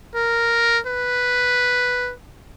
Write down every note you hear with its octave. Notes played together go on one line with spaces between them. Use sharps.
A#4
B4